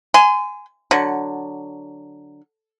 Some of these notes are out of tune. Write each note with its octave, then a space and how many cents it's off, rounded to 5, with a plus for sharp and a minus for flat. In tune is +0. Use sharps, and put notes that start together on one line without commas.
G#5 +0 C6 -35
D3 +0 F#3 +0